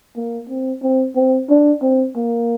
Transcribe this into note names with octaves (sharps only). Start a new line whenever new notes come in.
A#3
C4
C4
C4
D4
C4
A#3